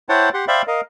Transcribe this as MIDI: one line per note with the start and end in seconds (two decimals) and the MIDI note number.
0.09 0.29 64
0.09 0.29 72
0.09 0.29 73
0.09 0.29 78
0.09 0.29 79
0.09 0.29 81
0.34 0.45 67
0.34 0.45 78
0.34 0.45 84
0.48 0.62 72
0.48 0.62 74
0.48 0.62 76
0.48 0.62 77
0.48 0.62 79
0.48 0.62 83
0.67 0.81 70
0.67 0.81 75
0.67 0.81 77